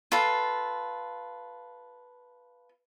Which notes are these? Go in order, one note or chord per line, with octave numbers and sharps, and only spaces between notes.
F4 A4 B4